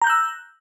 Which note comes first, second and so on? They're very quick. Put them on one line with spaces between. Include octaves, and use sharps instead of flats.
A#5 G6 F#6 E6